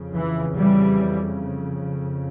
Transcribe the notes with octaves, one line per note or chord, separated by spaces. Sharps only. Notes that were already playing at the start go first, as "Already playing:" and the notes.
Already playing: F2 C#3
E3
E3 G3